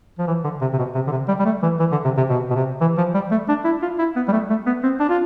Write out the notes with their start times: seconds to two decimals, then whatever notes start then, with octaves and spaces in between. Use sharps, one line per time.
0.19 F3
0.27 E3
0.44 D3
0.61 C3
0.73 C3
0.78 B2
0.95 C3
1.07 D3
1.12 C3
1.28 G3
1.39 G3
1.45 A3
1.63 E3
1.80 E3
1.92 D3
2.05 C3
2.17 C3
2.29 B2
2.50 B2
2.55 C3
2.81 E3
2.97 F3
3.14 G3
3.31 A3
3.49 D4
3.65 E4
3.82 F4
3.99 E4
4.16 B3
4.28 G3
4.32 A3
4.50 A3
4.66 B3
4.83 C4
5.00 D4
5.09 F4